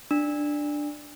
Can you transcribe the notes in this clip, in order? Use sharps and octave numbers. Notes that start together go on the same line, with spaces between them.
D4